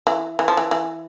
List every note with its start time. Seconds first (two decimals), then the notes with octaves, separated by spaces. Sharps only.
0.07 E3
0.39 E3
0.48 F3
0.57 E3
0.71 E3